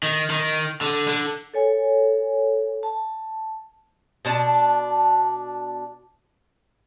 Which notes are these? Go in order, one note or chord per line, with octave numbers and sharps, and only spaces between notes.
D#3
D#3
D3
D3
A4 C#5 G#5
A5
B2 D4 A5